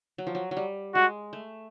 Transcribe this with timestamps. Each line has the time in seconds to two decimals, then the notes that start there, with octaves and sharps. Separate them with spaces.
0.18 F#3
0.27 F3
0.35 F#3
0.51 F#3
0.57 G3
0.95 G#3 F#4
1.33 A3